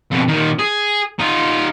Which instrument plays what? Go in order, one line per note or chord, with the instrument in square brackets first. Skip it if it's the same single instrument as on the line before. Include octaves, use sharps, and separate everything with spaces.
[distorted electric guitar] F2 B2
A#2 D#3
G#4
D#4 F4